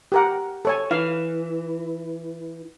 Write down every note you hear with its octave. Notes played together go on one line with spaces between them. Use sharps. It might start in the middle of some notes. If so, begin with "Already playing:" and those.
G4 A#4 F#5
A4 C#5 G#5
E3 F5